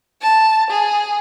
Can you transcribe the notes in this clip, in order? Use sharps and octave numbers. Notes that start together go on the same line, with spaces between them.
A5
G#4